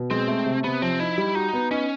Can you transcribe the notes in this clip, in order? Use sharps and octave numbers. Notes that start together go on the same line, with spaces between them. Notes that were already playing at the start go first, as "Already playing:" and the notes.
Already playing: B2
G#3 C4
A3
C3
C3 B3
F3 C4
D#4 E4
G3
D#4 F#4
B3
C#4 D#4